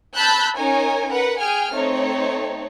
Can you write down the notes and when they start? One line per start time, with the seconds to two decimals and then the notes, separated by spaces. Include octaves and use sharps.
0.15 A5 B5 E6 F#6 G6
0.58 C#4 D#4 A#4 C#5 G#5
1.08 A#4 B4 F#5
1.41 G#4 G5 G#5 F6
1.73 A3 C4 D#4 C#5